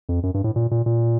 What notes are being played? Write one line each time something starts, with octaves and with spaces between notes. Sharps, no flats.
F2
F#2
G2
A2
A#2
A#2
A#2